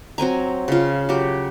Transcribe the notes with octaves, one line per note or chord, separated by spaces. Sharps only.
F#3 C4 G#5 A#5
C#3 F4
F#3 G4